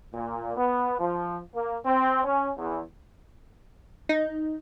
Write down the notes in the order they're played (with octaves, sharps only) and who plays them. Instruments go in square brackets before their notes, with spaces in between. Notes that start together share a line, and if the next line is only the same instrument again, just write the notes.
[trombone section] A#2
B3
F3
A#3
C4
C#4
E2
[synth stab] D#4